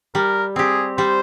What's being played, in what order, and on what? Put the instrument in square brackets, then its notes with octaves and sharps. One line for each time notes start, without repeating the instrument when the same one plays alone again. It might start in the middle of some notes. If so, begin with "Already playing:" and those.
[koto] G3 [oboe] A#4
[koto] C4 G4 [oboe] G#4
[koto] G3 [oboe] C5